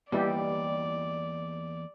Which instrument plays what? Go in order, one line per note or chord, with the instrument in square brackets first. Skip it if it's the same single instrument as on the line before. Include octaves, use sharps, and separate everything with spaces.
[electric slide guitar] E2 A#3 D#5 [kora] G3 [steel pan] B3 E4 G4 [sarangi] D5